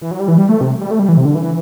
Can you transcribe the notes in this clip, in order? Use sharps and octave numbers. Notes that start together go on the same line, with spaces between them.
E3
F#3
G3
E3
G3
A3
C3
G3
A3
G3
E3
C3
D3
E3